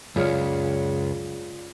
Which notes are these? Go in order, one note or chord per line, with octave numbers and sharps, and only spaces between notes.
C#2 F#2 F4 G#4 C#5 D5 F6